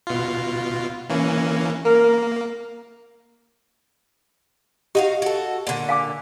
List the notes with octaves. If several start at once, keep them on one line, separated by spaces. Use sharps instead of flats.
B2 F4
E3 A#3 C#4
A#3 A#4
D#4 F#4 G4 F5
F#4 A4
A#2 D3
F5 G#5 D6